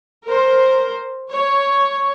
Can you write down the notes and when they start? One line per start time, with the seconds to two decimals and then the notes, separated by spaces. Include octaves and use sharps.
0.25 A#4 C5
1.30 C#5